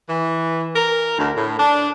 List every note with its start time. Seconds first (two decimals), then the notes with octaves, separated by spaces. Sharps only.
0.09 E3
0.76 A#4
1.18 D2
1.36 A2
1.59 D4